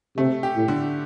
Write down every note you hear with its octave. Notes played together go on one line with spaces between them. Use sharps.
C3 A3
G4
A2
D3